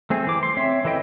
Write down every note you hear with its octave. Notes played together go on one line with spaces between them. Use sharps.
A3 C4 G#4
E3 D6
C6
C4 C#5 E5
E3 E4 A4 D#5 G5